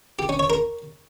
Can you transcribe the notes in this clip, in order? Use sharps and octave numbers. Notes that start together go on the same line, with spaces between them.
G4
C#4
C#5
A#4